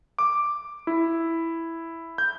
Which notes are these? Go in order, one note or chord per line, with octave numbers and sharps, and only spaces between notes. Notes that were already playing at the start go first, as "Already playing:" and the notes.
D6
E4
G6